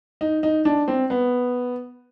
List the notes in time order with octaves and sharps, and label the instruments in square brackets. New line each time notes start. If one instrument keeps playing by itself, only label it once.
[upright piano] D#4
D#4
D4
C4
B3